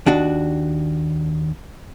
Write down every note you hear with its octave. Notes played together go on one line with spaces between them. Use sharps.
D#2 D4 F#4